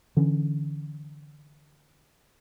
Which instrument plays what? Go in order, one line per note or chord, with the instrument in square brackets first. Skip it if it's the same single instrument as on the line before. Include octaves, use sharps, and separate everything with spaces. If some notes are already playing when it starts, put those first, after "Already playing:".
[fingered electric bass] D3 E3 C#4